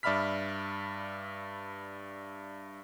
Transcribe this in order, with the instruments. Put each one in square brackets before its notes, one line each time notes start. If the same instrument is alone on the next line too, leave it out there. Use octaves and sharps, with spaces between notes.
[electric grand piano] G2 D5 E5 B5 F6 B6